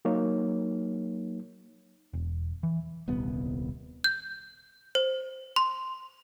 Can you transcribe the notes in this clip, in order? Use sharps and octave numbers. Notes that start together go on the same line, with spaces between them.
F#3 A#3 D#4 C#5
E1
E3
D#1 C2 B3
G6
C5
C6